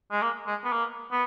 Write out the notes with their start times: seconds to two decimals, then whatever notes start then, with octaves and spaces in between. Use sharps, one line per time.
0.12 G#3
0.22 A#3
0.47 G#3
0.65 B3
0.72 A#3
1.12 B3